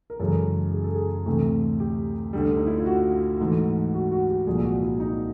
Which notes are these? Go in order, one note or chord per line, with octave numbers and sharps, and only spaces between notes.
A#4
F#2 C#3 E3 G#3 A4
G#4
A4
G#4
D2 C3 E3 A3
G4
D2 D3 G3
D#4
E4
F4
F#4
G#2 E3 A3
F#4
F#4
G4
C2 A#2 F3 G#3 G#4
F#4
E4
D#4